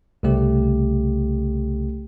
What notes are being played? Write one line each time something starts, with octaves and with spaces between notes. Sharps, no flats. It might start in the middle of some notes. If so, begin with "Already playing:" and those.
C2 C#3 A3 G4